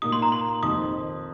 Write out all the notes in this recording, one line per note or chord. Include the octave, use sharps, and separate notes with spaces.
A#2 A#3 D#4 D#6
C6
A#5
C6
F2 D#3 C4 D#4 D#6